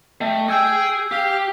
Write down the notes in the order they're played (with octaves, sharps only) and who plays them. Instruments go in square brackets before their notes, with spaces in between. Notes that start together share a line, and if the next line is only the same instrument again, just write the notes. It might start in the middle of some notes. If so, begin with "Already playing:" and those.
[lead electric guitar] A3 [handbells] D#5 G5
[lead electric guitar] G#4 G#5 [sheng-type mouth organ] G5 [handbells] E6 G6
[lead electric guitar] G4 [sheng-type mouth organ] F5